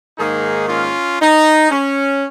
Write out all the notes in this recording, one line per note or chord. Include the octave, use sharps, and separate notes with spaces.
G#2 D#3 A#3 D#4 G#4
C#4 F4
D#4
C#4